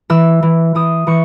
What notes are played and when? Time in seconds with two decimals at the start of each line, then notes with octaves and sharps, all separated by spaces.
0.10 E3 E6
0.43 E3
0.75 E3 D#6
1.07 E3 C#6